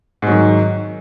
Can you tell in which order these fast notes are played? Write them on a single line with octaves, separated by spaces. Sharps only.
G#2 F#3 D#3